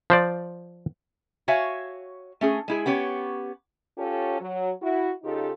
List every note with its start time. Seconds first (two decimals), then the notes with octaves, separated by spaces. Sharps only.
0.10 F3 C5 D5
1.48 F#4 C#5 E5 F5 G#5
2.41 A3 C#4 G#4
2.68 G#3 E4 G#4
2.86 B3 C#4 G4 C#5
3.98 C#4 F4 G4 A4 C#5
4.41 F#3
4.82 E4 F#4
5.24 C#3 D#4 F4 G4 A4